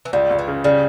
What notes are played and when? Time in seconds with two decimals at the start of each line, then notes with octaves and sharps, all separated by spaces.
0.05 E3
0.13 C#2 G3
0.31 C#2
0.39 E3
0.48 C#3
0.64 C#3 G3